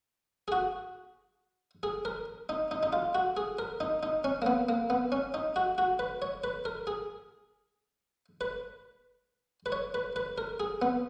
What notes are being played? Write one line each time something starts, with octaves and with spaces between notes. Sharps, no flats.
G#4
F#4
G#4
A#4
D#4
D#4
D#4
F4
F#4
G#4
A#4
D#4
D#4
C#4
A#3
B3
A#3
B3
C#4
D#4
F#4
F#4
B4
C#5
B4
A#4
G#4
B4
B4
C#5
B4
B4
A#4
G#4
B3